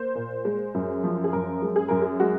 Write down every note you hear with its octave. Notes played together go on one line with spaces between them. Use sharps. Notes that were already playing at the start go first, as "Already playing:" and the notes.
Already playing: A#3 C5
A#2
G#3
F#2
F3
G#4
F#2 A#4
G#3
G#4
F#2 A#4
G#4
G#3 F#4